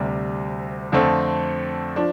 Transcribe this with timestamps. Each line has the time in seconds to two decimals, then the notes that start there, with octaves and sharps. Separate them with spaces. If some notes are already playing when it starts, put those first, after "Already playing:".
Already playing: D2 C3 G3
0.92 F2 D3 A3 C4
1.96 F3 D4